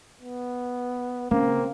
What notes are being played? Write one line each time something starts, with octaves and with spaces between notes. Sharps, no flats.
B3
C#3 A#3 C4